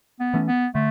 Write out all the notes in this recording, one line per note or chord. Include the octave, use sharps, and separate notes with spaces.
B3
E3 A3 C#4
B3
D3 A3